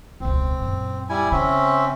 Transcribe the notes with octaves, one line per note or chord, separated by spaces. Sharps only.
E1 C#2 C4
F#2 A#2
G3 E4 G#5
C#3 C4 C#4 E5